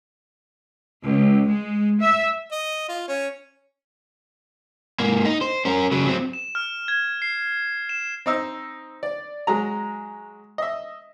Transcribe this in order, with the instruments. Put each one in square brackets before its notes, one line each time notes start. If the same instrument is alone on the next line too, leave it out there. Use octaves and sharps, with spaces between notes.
[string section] C#2
G#3
E5
[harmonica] D#5
F4
C#4
[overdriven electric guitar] G#2 A#3
D#4
C5
C#4 A#4
C#3 F#3
F#3 C4
[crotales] E7
F6
G#6
C7
E7
[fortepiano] C4 D#4 E6
D5
F#3 G#3 A#5
D#5 E5